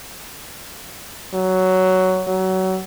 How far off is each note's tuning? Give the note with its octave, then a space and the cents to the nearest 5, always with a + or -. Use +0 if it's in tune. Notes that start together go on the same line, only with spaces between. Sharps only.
F#3 +10
F#3 +25